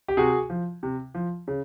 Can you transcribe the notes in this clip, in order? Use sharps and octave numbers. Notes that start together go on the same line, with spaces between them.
G4
C3 F#4 G#4
F3
C3
F3
C#3